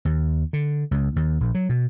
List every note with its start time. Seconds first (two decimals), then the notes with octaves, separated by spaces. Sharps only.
0.05 D#2
0.53 D3
0.91 C#2
1.16 D#2
1.40 A#1
1.55 F#3
1.69 B2